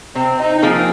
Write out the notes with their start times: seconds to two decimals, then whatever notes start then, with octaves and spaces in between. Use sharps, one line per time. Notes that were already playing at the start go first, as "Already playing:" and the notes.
0.15 C3 C4
0.40 D#4
0.58 D#4
0.62 F3 A#3 C4 G#4